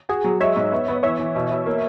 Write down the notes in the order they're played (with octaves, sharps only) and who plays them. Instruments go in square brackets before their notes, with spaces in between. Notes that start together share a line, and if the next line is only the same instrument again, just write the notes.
[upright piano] F#4 [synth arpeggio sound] G#4
[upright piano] F#3
[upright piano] G#3 [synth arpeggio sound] C#5 E5
[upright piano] G#2
B3
B3
[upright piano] E3 [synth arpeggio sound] C#5 E5
[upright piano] E3
B2
B2
A#3